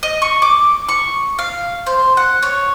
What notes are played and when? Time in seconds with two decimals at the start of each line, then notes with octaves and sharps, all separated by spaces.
0.03 D#5
0.22 C#6
0.42 D6
0.89 C#6
1.39 F5
1.86 C5
2.17 F#5
2.43 C#5